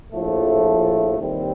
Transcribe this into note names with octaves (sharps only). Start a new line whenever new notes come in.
A#1 A2 F3 A3
D#2 D#3 G3 C4